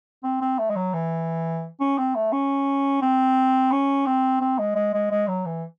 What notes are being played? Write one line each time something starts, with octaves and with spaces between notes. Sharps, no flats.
C4
C4
A3
G#3
F#3
E3
C#4
C4
A3
C#4
C4
C#4
C4
C4
G#3
G#3
G#3
G#3
F#3
E3